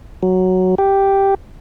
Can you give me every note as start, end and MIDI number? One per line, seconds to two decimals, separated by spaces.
0.23 0.75 54
0.78 1.35 67